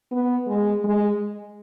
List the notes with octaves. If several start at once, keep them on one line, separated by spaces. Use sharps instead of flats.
B3
G#3
G#3